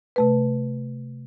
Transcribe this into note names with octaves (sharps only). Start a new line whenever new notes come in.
C3 A3 B4